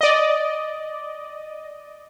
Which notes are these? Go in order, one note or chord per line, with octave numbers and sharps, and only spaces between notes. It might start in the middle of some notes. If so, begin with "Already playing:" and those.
D5 D#5